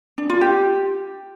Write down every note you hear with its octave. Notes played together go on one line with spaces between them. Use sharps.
D4
F4
G4